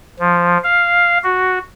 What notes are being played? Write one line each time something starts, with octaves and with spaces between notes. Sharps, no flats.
F3
F5
F#4